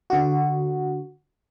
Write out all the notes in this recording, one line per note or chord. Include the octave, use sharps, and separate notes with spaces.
D3 F#4